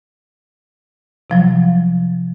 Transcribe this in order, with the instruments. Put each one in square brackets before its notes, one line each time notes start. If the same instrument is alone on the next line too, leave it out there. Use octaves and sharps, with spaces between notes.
[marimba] C3 F3 F#3